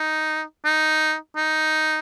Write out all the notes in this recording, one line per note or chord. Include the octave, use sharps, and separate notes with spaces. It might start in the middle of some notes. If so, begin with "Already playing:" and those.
Already playing: D#4
D#4
D#4